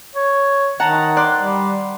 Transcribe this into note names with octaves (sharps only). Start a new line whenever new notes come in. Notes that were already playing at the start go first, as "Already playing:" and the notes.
C#5
D#3 F#5 A5 A#5
D5 C6 F#6
G3